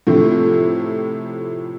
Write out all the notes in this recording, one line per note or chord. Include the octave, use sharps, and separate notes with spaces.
A2 C3 F3